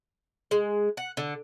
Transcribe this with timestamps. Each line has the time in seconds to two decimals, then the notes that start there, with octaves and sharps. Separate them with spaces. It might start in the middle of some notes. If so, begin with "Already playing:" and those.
0.51 G#3
0.97 F#5
1.17 D3